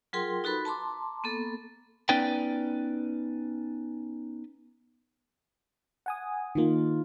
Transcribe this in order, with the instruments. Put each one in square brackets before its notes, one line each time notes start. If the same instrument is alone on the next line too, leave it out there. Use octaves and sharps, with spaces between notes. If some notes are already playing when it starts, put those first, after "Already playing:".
[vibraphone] F#3 F4 G#4 A#4 G5 C6
D#4 F#4 A4 B4 B5
A5 A#5 C6 D6
A#3 B3 A4
[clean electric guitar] B3 C#4 D#4 B4 D5 G5
[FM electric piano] F#5 G#5 D#6
[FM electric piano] D#3 A#3 [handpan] D#4 F4